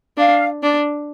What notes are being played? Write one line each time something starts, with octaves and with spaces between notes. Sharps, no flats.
D4 F5
D4